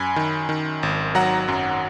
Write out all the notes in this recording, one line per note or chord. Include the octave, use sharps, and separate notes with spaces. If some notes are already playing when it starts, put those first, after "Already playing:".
Already playing: F#2 G#5 B5
D#3
D#3
G#1
F#3 F#5 A#5
F#2